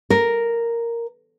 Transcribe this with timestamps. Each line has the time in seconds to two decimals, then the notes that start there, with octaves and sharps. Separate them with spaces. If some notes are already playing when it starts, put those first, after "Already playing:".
0.10 A#4